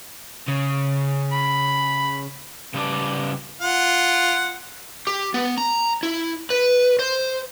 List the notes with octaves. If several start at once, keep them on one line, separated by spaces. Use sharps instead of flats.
C#3
B5
C#3 G3 B4 C5 D5 A5
F4 F#5
G4
B3
A#5
E4
B4
C5